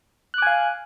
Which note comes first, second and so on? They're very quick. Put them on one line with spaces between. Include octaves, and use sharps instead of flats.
F#6 D6 G#5 F5